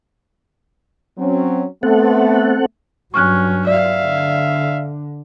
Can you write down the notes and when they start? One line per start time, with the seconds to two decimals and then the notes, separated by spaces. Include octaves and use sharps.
1.18 F#3 C4 C#4
1.83 A3 B3 C4 A4 F#5
3.14 G2 F#3 C#4 C#6 F6 F#6
3.67 D5 E5 F5
4.04 D3